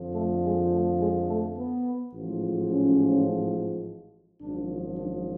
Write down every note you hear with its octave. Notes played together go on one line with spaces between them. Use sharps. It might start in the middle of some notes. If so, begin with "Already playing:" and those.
Already playing: F2 D3 F3
A3
G#3
A3
G#3
A3
B3
A1 G#2 F3
C#4
G#1 F#2 F3 D4
D4